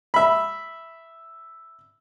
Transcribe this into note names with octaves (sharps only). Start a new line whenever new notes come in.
E5 B5